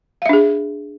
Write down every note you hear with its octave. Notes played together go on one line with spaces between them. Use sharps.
D4 G#4 E5 F5